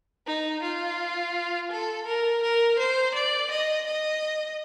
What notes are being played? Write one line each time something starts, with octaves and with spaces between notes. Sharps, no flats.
D#4
F4
A4
A#4
A#4
C5
D5
D#5
D#5